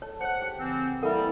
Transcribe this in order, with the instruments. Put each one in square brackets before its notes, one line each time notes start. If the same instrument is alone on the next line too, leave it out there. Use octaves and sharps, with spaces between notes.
[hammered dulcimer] A4 [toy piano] C#5
[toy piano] C5 C#5 [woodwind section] F#5
[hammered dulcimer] G4
[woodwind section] C#3 E3 C4
[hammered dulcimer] E3 A#3 E4 [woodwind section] G3 [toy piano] A4 A#4 F#5